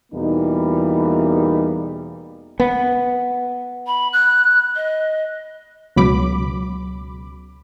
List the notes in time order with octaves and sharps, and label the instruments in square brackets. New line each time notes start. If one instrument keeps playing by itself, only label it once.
[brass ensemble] E2 B2 E3 G3 A#3 D#4
[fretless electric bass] B3
[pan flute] B5
F#6
D#5
[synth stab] C#2 B2 F#3 B5 D6